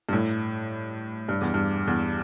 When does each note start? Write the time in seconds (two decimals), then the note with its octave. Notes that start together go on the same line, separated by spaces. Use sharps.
0.09 G2
0.13 A2
1.29 G2
1.42 E2
1.54 G2
1.87 E2